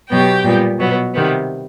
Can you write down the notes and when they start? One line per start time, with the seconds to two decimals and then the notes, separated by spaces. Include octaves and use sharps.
0.10 B2 F#3 B3 G4 G5
0.44 A#2 G3 B3
0.79 B2 F#3 B3
1.13 C3 D#3 G3 B3